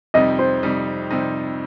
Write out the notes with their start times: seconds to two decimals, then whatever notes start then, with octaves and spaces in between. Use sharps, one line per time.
0.14 F2 C3 G3 D#4 D#5
0.39 C5
0.63 F2 C3 G3 D#4
1.11 F2 C3 G3 D#4